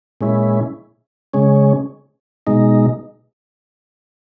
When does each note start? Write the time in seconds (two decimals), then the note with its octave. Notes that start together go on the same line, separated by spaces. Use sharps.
0.21 A#2 G#3 C#4 E4
1.34 C#3 G#3 C#4
2.47 B2 G#3 D#4